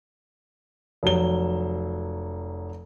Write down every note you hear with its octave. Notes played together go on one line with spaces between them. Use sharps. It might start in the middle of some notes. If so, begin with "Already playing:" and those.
F1 F#3 G7